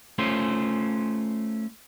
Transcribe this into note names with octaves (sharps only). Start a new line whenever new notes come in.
A3 C#4 F4 C5